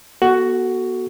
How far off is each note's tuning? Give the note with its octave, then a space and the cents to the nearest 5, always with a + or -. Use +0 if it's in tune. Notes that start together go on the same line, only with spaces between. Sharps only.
B3 -35 F#4 +10 A4 +0